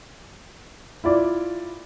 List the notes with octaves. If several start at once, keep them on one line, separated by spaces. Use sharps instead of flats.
E4 F4 D5